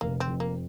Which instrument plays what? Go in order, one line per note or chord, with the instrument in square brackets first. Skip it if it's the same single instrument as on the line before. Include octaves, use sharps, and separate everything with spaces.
[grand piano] F1 [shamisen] A#3
[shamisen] C4
[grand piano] F2
[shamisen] A#3